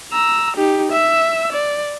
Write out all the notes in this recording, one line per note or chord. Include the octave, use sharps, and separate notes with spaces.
A#5 E6
D#4 G4
E5 E6
D5